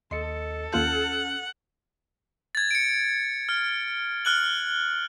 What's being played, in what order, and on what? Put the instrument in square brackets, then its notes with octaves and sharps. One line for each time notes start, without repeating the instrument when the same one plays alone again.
[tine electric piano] D#2 D#5 C#7 [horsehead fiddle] A4 [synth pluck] C6
[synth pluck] D#2 F4 A5 [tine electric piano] C#4 F6 G6 [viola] F#5
[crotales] G#6 A6
C#7 D7
F6
F6 F#6 F#7